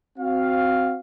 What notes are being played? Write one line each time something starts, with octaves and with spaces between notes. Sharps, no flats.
C4 F#4 F5